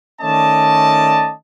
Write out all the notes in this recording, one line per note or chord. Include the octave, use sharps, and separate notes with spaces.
D#3 A3 C#4 D5 D#5 A5